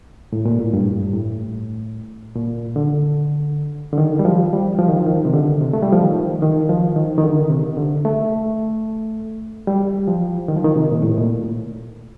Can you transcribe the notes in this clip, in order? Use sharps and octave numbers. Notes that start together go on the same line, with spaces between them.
A2
A#2
A2
G2
A2
A#2
D3
D3
D#3
G3
F3
G3
F3
D#3
F3
D#3
C3
D3
C3
A3
G3
F3
D#3
D#3
F3
D#3
D#3
D3
C3
D3
A3
G3
F3
D#3
F3
D#3
C3
A#2
A2
A#2